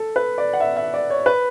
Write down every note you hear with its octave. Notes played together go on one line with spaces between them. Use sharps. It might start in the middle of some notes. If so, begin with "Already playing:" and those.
Already playing: A4
B4
D5
F#5
E5
E5
D5
C#5
B4